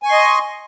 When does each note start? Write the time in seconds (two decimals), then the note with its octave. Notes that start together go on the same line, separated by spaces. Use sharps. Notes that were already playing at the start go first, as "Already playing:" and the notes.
0.03 G#5
0.06 C#6
0.09 C6
0.12 D#5